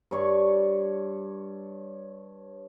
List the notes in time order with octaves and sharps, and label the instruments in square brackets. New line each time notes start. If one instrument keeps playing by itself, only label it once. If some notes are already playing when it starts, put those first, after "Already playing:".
[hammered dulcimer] G2 C#5 D5 C#6